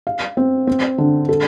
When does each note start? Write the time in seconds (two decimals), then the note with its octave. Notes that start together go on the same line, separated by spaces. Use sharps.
0.07 F5
0.37 C4
0.67 C4
0.98 D3
1.29 A4